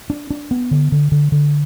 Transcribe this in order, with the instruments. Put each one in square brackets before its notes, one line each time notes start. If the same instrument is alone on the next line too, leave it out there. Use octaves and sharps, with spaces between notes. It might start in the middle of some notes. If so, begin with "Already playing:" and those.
[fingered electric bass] D4
D4
B3
D3
D3
D3
D3